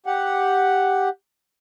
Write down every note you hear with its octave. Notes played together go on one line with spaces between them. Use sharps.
G4 F#5